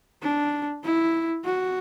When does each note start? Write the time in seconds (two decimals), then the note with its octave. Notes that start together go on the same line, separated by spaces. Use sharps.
0.22 D4
0.84 E4
1.45 F#4